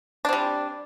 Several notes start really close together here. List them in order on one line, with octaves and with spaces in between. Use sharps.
D4 C4 G3